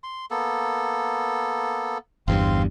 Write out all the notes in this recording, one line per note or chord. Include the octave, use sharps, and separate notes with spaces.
C6
A#3 B3 A4
G1 E2 G2 C4 F5 C6